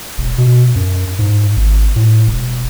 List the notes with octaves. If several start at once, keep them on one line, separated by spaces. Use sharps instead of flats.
E1
B2
F#2
G#2
G#1
A2
E1